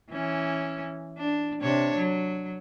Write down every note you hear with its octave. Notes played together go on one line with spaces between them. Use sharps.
E3 C#4
D4
C3 D4 C#5
F#3